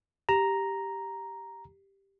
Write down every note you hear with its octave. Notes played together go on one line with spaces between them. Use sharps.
G4 A#5